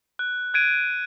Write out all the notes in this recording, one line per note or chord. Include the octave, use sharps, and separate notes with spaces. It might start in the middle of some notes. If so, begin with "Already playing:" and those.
F#6
F#6 G#6 D7 D#7